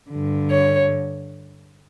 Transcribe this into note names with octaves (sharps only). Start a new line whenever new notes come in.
G2 D3
C#5